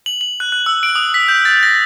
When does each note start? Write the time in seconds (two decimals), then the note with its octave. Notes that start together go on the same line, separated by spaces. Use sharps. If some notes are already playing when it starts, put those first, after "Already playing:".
0.06 F#7
0.21 F#7
0.40 F#6
0.52 F#6
0.66 E6
0.83 D7
0.96 D#6
1.14 B6
1.28 G6
1.45 A6
1.63 A#6